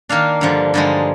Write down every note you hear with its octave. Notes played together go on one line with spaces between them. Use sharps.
D#3 A#3 D4 F5
G2 D3 F3
G2 D3 F3 G#3 D#4